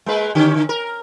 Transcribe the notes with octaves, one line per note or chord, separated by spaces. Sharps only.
G#3 A#3 B4
D3 C#4 G4
D3
A#4